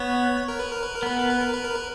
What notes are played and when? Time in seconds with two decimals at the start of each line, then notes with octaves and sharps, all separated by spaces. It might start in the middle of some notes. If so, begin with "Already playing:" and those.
Already playing: B3 C#5
0.48 A#4
0.59 B4
0.72 A#4
0.83 B4
0.95 A#4
1.03 B3 B4
1.18 A#4
1.30 B4
1.41 A#4
1.53 B4
1.64 A#4
1.76 B4